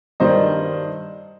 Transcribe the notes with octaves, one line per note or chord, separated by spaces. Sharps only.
G2 D#3 G3 C5 D#5